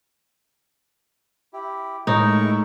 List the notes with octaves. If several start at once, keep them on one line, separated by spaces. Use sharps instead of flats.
E4 G4
A2 G#3 A3 D#4 E4 A#4 C#5 C#6